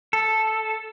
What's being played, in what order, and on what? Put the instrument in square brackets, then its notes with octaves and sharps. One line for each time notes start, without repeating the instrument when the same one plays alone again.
[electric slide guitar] A4